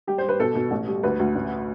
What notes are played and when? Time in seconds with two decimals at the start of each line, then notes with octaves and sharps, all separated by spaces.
0.07 G3 G4
0.18 G3 C5
0.29 B4
0.40 B2 A4
0.55 B2
0.71 A1
0.88 G3
1.03 D2 B4
1.19 D2
1.35 A1